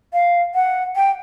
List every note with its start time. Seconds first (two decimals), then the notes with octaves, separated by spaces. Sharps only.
0.13 F5
0.55 F#5
0.96 G5